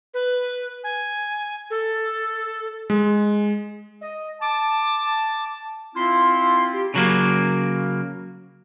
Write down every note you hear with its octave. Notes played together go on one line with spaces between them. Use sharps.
B4
G#5
A4
G#3
D#5
A5 D6
C4 E4 F4 C6
G4
C#3 F#3 A#3